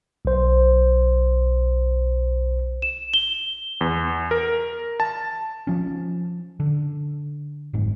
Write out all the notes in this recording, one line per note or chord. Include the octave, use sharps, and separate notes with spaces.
B1 C5
E7
G7
E2
A#4
A5
F3 C#4
D3
F#1 G#2